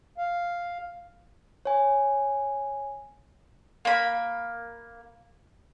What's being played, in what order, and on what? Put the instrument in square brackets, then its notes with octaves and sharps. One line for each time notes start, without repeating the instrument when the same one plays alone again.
[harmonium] F5
[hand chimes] C#5 G#5
[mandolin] A#3 B5